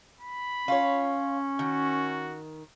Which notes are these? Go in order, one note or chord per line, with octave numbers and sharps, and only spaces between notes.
B5
C#4 F4 C#5
D#3 F#4